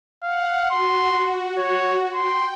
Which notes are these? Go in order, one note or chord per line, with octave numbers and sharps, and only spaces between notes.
F5 F#5
F#4 C6
C#5
G5 C6